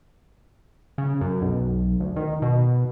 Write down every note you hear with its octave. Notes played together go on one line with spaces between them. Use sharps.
C#3
F#2
B1
D2
D#3
B2